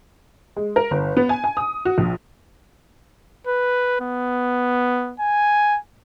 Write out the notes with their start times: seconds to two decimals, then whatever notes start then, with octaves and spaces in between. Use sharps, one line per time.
0.56 G#3
0.76 A#4
0.91 G1
1.17 B3
1.29 G#5
1.44 G#5
1.57 D#6
1.85 F#4
1.98 A#1
3.47 B4
4.00 B3
5.20 G#5